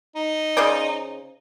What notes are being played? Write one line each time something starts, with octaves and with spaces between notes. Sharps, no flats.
D#4
C#3 C5 D5